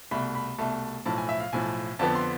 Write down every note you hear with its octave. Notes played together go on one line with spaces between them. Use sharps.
C2 B2 A3 B5
B5
C2 B2 A3 A5
B1 A2 F3 A5
G#5
E5
F5
B1 A2 F3 G#5
F2 D3 F3 B3 A5
C6